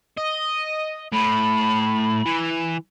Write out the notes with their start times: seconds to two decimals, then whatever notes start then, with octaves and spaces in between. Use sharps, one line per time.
0.18 D#5
1.12 A2 B5
2.26 E3